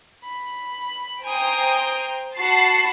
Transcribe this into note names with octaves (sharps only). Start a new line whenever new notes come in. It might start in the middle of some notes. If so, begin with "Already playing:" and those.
B5
C5 G5 G#5 A#5 D#6
F#4 F#5 A5 B5 C7